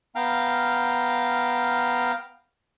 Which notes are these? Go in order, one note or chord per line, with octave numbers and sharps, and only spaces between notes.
B3 F5 G5 A#5 F6